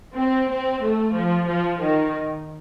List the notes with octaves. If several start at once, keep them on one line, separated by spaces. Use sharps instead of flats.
C4
C4
A3
F3
F3
D#3